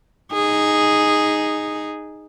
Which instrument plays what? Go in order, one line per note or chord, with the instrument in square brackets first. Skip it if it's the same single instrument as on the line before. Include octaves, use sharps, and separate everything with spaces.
[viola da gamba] D#4 G#4